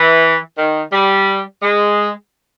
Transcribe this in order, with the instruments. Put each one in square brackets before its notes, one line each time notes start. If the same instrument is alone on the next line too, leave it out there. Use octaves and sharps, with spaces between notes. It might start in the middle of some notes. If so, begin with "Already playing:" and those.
Already playing: [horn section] E3
D#3
G3
G#3